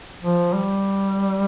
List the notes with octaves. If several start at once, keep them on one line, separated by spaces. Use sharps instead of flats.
F3
G3